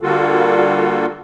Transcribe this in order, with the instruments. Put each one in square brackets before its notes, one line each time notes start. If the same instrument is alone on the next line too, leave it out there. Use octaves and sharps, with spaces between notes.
[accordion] D3 G3 A#3 F4 F#4 A4